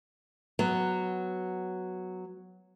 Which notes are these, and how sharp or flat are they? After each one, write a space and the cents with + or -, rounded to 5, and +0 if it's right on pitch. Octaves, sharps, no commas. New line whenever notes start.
F#3 +0 B3 +5